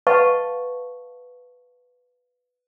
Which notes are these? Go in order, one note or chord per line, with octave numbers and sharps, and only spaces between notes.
B4 D#5 F5 F#5 A5 C#6